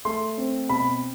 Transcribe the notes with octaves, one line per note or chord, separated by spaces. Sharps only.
A3 C6
C4
B2 B5